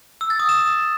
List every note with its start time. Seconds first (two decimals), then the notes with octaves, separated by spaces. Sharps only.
0.21 E6
0.30 A6
0.40 D#6
0.49 E7